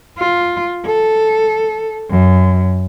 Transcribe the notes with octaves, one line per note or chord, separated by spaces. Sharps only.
F4
A4
F#2